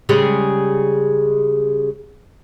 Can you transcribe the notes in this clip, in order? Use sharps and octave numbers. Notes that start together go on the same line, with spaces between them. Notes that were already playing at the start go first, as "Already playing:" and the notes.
C#3 G3 G#3